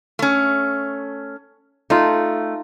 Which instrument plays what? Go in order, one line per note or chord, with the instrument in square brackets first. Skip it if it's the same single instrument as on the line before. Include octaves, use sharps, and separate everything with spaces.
[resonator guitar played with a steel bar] A3 C#4
[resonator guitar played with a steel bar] A3 [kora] D#4 F4